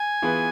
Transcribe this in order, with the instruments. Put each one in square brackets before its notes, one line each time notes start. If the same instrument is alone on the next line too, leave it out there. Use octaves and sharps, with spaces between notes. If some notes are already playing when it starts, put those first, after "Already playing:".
Already playing: [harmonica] G#5
[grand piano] E3 B3 F4 G#4 B4